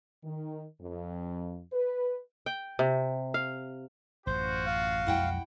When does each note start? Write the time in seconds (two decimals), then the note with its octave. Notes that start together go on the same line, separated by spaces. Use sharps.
0.24 D#3
0.81 F2
1.73 B4
2.46 G5
2.79 C3
3.34 F5
4.27 A1 F#2 F4 F#4 C5
4.66 F5
5.07 B1 F2 G#3 E4 F#5 G5